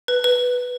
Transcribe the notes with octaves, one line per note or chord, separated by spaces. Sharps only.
B4
B4